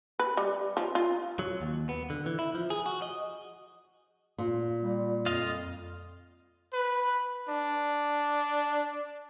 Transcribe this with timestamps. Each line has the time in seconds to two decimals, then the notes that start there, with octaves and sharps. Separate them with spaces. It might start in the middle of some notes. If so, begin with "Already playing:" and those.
0.19 B4
0.37 G3
0.77 F3
0.95 F4
1.39 F#3
1.61 D#2
1.89 B3
2.10 D3
2.26 E3
2.39 E4
2.54 F3
2.70 G#4
2.86 F#4
3.02 D#5
4.38 A#2
4.82 G3
5.26 F2 F4 D#5 F5
6.73 B4
7.49 D4